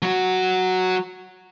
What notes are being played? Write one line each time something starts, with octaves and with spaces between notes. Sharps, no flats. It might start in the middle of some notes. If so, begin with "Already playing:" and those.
F#3 F#4